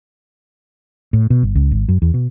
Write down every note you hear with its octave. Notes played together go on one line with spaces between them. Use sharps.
A2
B2
G1
C#2
G#1
F#2
E2
B2